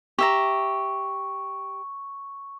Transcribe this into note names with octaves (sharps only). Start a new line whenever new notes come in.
G4 E5 A#5 C#6